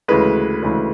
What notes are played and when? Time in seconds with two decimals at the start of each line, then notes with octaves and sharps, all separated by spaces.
0.08 D2 C#3 E3 G#3 B4
0.63 D2 C#3 E3 G#3